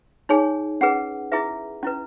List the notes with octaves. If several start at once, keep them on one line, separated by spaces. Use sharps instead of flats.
D#4 G#4 C#5 G#5
C#4 G#4 B4 F#5
E4 G#4 B4 E5
C#4 E4 B4